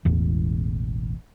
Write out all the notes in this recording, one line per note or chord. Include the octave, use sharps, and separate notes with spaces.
E1 A1 E2